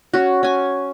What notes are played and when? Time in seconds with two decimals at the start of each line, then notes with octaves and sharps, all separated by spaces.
0.14 C#4 F#4
0.43 C#4 G#5